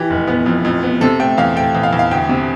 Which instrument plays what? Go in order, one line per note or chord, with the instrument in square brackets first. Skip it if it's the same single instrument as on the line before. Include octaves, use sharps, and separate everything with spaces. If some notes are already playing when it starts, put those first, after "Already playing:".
Already playing: [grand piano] E3 G4
F1
B3
F2
F2
B3
C3 A4
A3 G5
E2 F5
A3 G5
E2
F5
E2
F5
D2 G5
C3